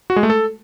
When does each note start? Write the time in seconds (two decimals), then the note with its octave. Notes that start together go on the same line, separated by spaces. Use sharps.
0.10 F#4
0.16 G#3
0.23 A3
0.30 A4